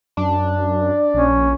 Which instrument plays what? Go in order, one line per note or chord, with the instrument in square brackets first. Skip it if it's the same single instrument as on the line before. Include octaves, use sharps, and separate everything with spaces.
[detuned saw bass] F#2 [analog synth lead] D4
[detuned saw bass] A#1 [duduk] C#4